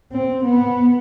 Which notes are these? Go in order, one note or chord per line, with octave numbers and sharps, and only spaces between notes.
C4
B3